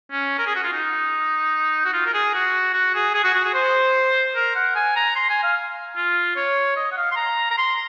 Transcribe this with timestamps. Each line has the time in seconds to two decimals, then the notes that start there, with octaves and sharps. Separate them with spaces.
0.12 C#4
0.39 A#4
0.47 G#4
0.55 F#4
0.64 F4
0.73 D#4
1.85 F#4
1.94 F4
2.06 A#4
2.14 G#4
2.34 F#4
2.74 F#4
2.95 G#4
3.14 G#4
3.24 F#4
3.35 F#4
3.45 G#4
3.54 C5
4.36 A#4
4.56 F#5
4.76 G#5
4.96 A#5
5.16 C6
5.29 G#5
5.43 F5
5.96 F4
6.37 C#5
6.77 D#5
6.92 F#5
6.97 F5
7.12 C6
7.16 A#5
7.51 A#5
7.58 C6